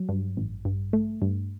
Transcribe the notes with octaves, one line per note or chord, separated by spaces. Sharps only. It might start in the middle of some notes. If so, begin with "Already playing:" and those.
Already playing: F#3
G2
A1
G2
A3
G2